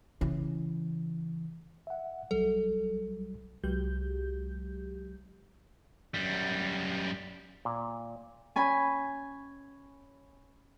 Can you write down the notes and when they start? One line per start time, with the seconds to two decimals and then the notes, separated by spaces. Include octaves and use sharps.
0.21 C#3 E3
1.87 E5 F#5
2.31 B1 F#3 G3 A4
3.64 C2 F#3 G#3 G4 G6
6.14 F#2 G3
7.65 A#2
8.56 C#4 G#5 B5